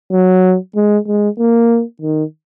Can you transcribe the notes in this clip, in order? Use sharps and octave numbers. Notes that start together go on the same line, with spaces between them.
F#3
G#3
G#3
A#3
D#3